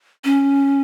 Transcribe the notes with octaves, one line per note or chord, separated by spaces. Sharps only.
C#4